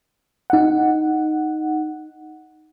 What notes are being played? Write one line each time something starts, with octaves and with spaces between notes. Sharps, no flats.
D#4 F#5